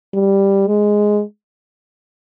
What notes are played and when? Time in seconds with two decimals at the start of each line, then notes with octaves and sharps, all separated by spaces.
0.14 G3
0.67 G#3